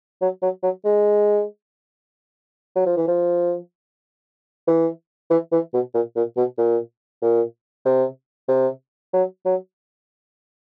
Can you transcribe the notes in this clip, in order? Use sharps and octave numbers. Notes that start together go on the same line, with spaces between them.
F#3
F#3
F#3
G#3
F#3
F3
E3
F3
E3
E3
E3
B2
A#2
A#2
B2
A#2
A#2
C3
C3
F#3
F#3